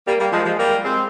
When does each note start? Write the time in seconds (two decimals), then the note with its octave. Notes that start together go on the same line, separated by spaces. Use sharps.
0.07 G3 A#3
0.20 G3 A#3
0.32 F3 G#3
0.45 F3 G#3
0.58 G3 A#3
0.84 G#3 C4